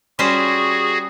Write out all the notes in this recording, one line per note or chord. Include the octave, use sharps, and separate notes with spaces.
G3 C#4 F#4 G#4 C5